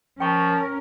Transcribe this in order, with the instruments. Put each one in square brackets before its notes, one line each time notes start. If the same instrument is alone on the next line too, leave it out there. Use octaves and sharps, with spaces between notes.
[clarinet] F3 [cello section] C#4 A#4 [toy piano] G5 C#6